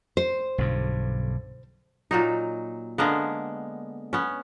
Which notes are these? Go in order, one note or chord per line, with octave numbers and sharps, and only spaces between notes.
C5
B1 G2 D3
A#2 F#3 D#4
D3 G#3 A#3 B3
B3 C#4